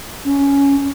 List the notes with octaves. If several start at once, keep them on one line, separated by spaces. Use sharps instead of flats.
C#4